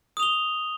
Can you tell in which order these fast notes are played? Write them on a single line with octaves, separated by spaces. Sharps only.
D#6 F7 G7